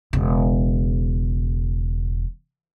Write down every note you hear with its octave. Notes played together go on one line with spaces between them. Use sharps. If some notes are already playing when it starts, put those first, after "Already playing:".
E1 C#3